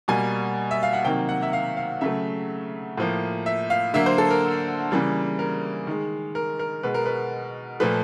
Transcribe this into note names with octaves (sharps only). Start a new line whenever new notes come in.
B2 G3 A#3 G#5
E5
F5
F#5
C3 D#3 F#3 A#3 G5
F#5
E5
F5
F5
C#3 F#3 A3 E5
A2 F3 A#3
E5
F5
D3 F#3 A#3 E5
C5
A4
A#4
C#3 E3 G3 A#3
A#4
D#3 G#3
A#4
A#4
B2 G#3 B4
A#4
B4
A#2 F3 A3 B4